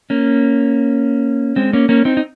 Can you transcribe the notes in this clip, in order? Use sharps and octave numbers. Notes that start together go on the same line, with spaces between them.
A#3 C#4
G#3 C4
A#3 C#4
A#3 C#4
C4 D#4
D#4